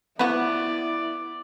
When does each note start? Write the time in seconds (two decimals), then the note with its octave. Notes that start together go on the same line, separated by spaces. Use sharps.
0.19 F3 B3 E4 F#4 B4 D5